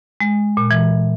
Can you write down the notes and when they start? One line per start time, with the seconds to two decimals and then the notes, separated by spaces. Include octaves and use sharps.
0.20 G#3
0.57 A#2
0.71 E3